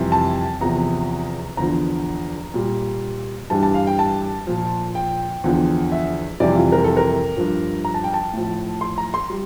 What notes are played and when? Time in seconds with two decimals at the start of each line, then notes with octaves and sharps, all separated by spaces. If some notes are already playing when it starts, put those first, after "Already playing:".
Already playing: F2 C3 E3 G3
0.12 A5
0.61 E2 C3 F3 A#5
1.57 E2 D3 F3 A#5
2.54 A#2 G3
3.50 G2 E3 G3 A5
3.63 A5
3.74 F5
3.87 G5
3.99 A5
4.47 A#2 F3
4.95 G5
5.44 E2 D3 F3
5.92 E5
6.40 F2 C3 E3 G3 D5
6.56 F4
6.72 A#4
6.84 A4
6.97 A#4
7.36 G2 F3
7.85 A#5
7.94 A5
8.04 G5
8.14 A5
8.33 A2 F3
8.81 C6
8.98 A#5
9.14 C6
9.30 G3